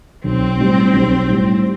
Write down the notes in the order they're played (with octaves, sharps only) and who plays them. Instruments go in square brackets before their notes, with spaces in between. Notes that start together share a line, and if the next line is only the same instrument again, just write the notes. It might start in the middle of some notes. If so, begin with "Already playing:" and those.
[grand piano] B1 [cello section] C4
[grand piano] A2 G3
B1
A2 G3